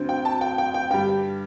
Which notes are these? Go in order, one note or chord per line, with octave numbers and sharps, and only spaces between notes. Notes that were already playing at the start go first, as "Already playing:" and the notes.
Already playing: D2 D3 C4
G5
A5
G5
G5
G5
G2 D3 G3 G5